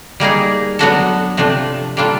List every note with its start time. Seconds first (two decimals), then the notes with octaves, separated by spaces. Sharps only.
0.20 G3 A#3 D#4 G#4
0.79 F#3 B3 D4 F#4 A4
1.37 C3 F3 A3 D4
1.97 G3 A#3 D4 F4 A4